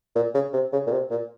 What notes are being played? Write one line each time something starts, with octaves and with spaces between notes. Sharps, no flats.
A#2
C#3
C3
C#3
A#2
C3
A#2